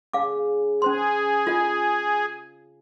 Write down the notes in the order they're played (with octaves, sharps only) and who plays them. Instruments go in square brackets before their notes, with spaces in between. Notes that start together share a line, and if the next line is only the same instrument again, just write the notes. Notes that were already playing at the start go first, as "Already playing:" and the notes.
[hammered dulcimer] C#3 [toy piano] F5 D6
[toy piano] C#4 C5 C6 [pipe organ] G#4
[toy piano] F4 D#5